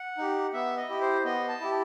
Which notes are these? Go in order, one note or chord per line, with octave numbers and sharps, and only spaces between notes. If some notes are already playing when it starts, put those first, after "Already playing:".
Already playing: F#5
D#4 G4
B3 E5
D#5
E4 G4
C5
B3 D#5
A5
E4 G4